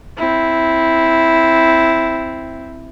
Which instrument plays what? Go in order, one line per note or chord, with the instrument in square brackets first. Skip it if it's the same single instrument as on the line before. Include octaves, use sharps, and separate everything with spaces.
[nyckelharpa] C4 E4